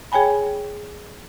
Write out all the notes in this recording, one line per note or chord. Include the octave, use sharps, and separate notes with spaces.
G#4 C#5 G5 G#5 B5